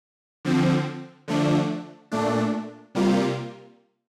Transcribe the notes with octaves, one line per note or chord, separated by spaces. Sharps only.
D3 F3 C4
D3 F3 A3 D4
A#2 A3 D4
C3 G3 A#3 F4